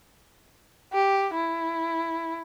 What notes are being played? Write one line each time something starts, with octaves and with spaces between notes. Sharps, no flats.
G4
E4